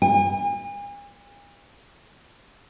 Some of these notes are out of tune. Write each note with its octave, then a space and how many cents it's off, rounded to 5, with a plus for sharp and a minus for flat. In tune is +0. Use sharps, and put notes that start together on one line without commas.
G#5 -40